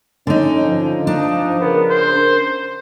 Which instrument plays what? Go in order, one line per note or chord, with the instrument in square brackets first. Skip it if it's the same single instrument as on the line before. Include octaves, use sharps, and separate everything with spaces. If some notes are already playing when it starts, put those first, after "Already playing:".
[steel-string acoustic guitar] D3 D#4 [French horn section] C#4
[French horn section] F3
[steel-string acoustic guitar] D4 [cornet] D#4
[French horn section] C#3 A#4 [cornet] B3
[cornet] C5